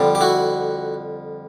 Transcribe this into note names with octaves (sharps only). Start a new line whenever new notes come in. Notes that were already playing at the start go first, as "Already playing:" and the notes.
Already playing: F2 D3 G3
G4
E4 F#4